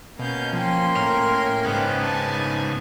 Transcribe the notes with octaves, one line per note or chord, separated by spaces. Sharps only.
B2 A#3 C#4 F5 G6
F3 G5 C6
A2 A#4 A#5
G#2 C#3 B3 G5 D6
G#5 A5